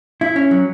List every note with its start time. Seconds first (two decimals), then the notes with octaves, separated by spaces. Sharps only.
0.21 E4
0.36 C#4
0.51 F#3